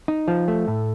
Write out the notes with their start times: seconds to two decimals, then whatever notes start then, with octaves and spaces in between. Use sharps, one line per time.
0.08 D#4
0.28 F3
0.48 A3
0.68 A2